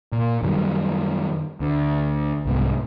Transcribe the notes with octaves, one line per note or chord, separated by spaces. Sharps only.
A#2
F#2 D#3 G3
D2
C2 G#2 B2